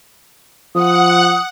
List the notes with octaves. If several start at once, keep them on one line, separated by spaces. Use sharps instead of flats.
F3 F#5 D#6